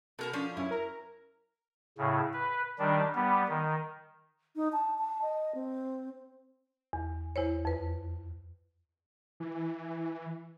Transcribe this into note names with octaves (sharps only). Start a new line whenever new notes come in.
B2 A4 A#4 A5
F3 C#4 D4
F#2 C#4 E4
A#4 A#5
A2 C#3
B4
D#3 G3 D4
G3 B3
D#3
D#4
A5
A5
D#5
C4
E2
E2 E4 C5 C#5
F2 B4
E3